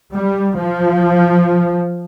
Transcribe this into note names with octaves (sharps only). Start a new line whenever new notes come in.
G3
F3